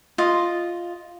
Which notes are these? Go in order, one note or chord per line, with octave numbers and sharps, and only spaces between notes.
F4 D#5